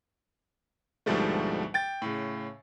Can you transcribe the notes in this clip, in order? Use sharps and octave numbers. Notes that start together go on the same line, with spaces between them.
D2 G#2 B2 F3 G3 A3
G5 A6
A2 C#3